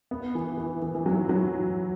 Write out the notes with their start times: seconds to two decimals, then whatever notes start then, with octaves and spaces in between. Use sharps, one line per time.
0.11 B3
0.35 E3
0.58 E3
0.82 E3
0.95 E3
1.06 F#3
1.29 F#3